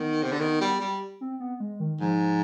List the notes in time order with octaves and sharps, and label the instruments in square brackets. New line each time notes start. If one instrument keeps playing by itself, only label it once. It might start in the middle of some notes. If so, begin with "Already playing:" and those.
Already playing: [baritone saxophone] D#3 [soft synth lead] B3
[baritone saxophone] C3
D3
D#3
G3
G3
[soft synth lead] C4
B3
G#3
D#3
[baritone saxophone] G#2 [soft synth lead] F3